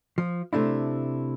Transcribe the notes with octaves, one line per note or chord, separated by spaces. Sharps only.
F3
C3 A3 D4 E4